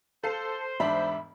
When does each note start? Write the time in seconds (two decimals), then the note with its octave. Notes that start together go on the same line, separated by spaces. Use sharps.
0.24 A4 C5 F5 C7
0.80 E1 G#2 D4 E5 B5